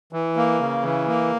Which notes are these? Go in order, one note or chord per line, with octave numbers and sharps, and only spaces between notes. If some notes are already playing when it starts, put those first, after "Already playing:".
E3
A#3
C#3
E3
A#3